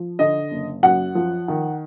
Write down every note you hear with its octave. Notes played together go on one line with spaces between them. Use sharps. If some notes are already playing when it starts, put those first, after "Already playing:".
Already playing: F3
D3 D#5
F#1
F#2 F#5
F3
D#3